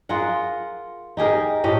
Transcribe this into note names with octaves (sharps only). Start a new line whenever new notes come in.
F4 G#4 A#4 F#5
D#4 G4 G#4 A#4
A2 G4 D#5